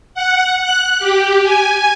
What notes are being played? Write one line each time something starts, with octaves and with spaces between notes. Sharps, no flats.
F#5
F#6
G4
G#5